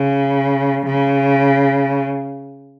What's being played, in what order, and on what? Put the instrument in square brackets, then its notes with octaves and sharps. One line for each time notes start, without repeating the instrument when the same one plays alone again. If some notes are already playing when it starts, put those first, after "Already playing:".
Already playing: [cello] C#3
C#3